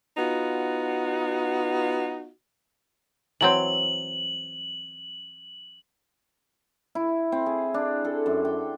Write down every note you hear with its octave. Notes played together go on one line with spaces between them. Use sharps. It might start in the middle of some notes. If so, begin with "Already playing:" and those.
B3 D#4 F4 F#4
E3 F#3 C4 F#7
E4
C4
G#4
D4
A4
F#2
G5